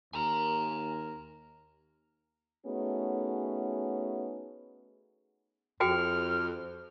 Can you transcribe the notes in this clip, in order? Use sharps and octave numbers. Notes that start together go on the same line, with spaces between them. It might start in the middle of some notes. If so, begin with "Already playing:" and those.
D#2 A#4 G#5 A#5
A3 B3 C#4 D#4 F#4 G#4
F2 F#4 G#4 G5 F6